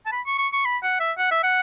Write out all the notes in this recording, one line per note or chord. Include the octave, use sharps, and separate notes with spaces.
A5
B5
C#6
C#6
C#6
B5
F#5
E5
F#5
E5
F#5